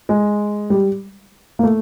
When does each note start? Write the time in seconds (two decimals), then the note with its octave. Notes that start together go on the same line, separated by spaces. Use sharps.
0.09 G#3
0.70 G3
1.59 A#3
1.63 A3